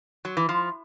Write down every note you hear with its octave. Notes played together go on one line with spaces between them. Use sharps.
F#3
E3
F3